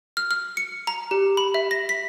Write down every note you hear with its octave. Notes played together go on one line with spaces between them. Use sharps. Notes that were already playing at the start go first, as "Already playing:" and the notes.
F6
F6
C#7
A#5
G4
B5
E5
A#6
B6